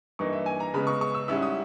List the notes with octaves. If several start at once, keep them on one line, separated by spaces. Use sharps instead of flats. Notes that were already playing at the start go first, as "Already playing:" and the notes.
G2 E3 A#3 D#4 C#6
E5
G#5
A#5
C#3 G#3 B3 B5
C#6
C#6
E6
G#2 G3 C#4 E4 E6
D#6